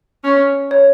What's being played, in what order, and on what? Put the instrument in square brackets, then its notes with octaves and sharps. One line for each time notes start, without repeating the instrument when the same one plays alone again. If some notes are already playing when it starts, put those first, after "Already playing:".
[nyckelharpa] C#4
[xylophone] C#5